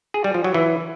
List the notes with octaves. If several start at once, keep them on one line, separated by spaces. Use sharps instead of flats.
G#4
G3
F3
F#3
E3